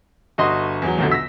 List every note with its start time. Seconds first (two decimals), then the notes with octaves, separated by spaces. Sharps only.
0.38 G1 F#4 D#5 C6
0.82 E2 F#3
0.98 A#1 B2 D3
1.11 E6 A#6 B6